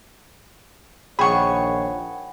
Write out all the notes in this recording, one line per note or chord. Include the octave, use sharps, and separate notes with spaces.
A#1 D#3 G#4 C#5 F#5 G5 B5 C#6